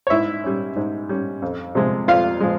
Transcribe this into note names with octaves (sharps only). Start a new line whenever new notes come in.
C#5
G#2 E4 E5
G3 C#4
G#2
G3 C#4
F2
C3 F3 G#3
F2 F4 F5
F3 G#3